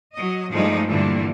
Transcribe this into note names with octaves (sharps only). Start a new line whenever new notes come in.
F#3 D#5
G2 F3 G#3 A3 D#4
G2 A#2 D3 E3 G3